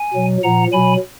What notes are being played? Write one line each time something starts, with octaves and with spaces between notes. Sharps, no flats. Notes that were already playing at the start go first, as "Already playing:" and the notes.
Already playing: G#5
B2 F#3
A#2 F3 F#5 A#5
B2 F#3 G#5 B5